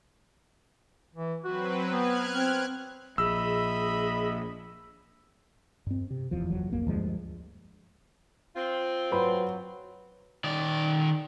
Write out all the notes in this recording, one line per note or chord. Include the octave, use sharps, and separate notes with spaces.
E3
F#3 C4 F#4 B4
B3 F6 F#6 G#6
C4
A#1 G#4 D#5 E5 B5 E6
G2 C4
C3
D1 E2 F3
F#1 E3 F#3
A#1 F2 A#3
D2 G2 F3 G#3
C4 F4
F#3 B4 B5 C6
D#3 D5